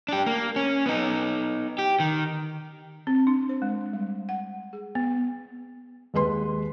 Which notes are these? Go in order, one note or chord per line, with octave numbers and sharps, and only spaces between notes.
D4 G4
A#3
C#4
B3 D#4
G4
D#3
C4
D4
C5
G#3
G3
F#5
G#4
B3
D#2 G#3 B4 C6